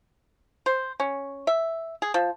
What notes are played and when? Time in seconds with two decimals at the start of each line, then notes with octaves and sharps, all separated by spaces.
0.66 C5
1.00 C#4
1.47 E5
2.02 G#4
2.14 F3